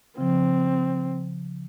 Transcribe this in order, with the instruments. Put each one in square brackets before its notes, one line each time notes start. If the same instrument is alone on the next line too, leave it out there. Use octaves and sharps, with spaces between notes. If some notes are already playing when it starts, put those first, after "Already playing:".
[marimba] C#3 F3 [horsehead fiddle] C4